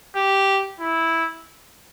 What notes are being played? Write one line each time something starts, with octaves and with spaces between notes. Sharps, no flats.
G4
E4